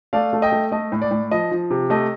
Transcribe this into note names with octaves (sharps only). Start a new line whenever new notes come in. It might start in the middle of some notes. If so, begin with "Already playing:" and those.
A3 D5 F5
A3
D#5 G5
A3
A3 D#5
A2
D5
A2
F3 D#5
F3
C3
A3 D#5